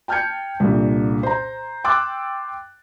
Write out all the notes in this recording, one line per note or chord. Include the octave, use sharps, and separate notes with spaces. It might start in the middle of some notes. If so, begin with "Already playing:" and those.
G5 A5 F6 G6 G#6 C#7
C2 A#2 D3
C5 A#5
G5 C6 D6 E6 F#6 A6